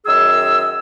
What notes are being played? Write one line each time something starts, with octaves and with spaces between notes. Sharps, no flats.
F#2 D#3 G#4 E6